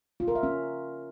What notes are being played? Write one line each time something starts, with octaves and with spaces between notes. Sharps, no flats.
F4
A#4
E5
C#4